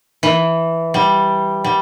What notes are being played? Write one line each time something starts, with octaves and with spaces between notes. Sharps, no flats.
E3
G3
G3